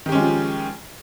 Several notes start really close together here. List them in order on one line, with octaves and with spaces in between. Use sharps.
D#3 G4 C#4 G#3 F3